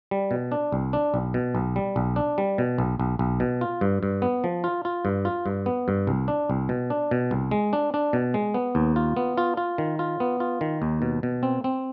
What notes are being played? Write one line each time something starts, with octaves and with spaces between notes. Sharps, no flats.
G3
B2
D4
C2
D4
B1
B2
B1
G3
B1
D4
G3
B2
B1
B1
B1
B2
F4
G2
G2
B3
F3
F4
F4
G2
F4
G2
B3
G2
C2
D4
C2
B2
D4
B2
C2
G#3
D4
D4
B2
G#3
B3
D#2
F4
B3
F4
F4
D#3
F4
B3
F4
D#3
D#2
B2
B2
C4
C4